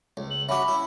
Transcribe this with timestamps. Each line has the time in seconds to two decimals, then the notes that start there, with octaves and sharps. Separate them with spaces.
0.17 C#2
0.31 F#7
0.49 C#4 F#4 E5 F#5 B5 D6
0.68 E4